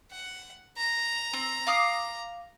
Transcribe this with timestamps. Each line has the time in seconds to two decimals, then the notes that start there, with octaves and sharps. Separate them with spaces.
0.11 F#5
0.77 A#5
1.33 C4
1.67 F5 D6 D#6